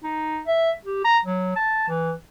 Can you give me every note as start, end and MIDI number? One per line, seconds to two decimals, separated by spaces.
0.04 0.40 63
0.47 0.71 76
0.85 1.00 67
1.05 1.18 82
1.25 1.52 54
1.56 1.88 81
1.88 2.13 52